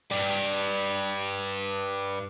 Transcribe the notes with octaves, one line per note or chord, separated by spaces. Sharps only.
G2 G3